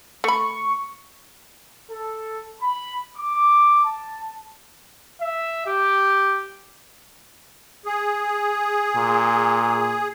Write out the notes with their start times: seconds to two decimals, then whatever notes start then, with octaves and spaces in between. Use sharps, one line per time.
0.24 A3 B5 C#6
1.90 A4
2.61 B5
3.17 D6
3.84 A5
5.21 E5
5.67 G4
7.86 G#4
8.96 A#2